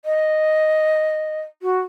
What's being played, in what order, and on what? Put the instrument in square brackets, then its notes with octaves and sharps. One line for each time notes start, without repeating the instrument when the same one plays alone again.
[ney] D#5
F#4